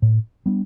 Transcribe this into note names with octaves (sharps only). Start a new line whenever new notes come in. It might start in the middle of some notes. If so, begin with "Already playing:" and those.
A2
G3 B3 D4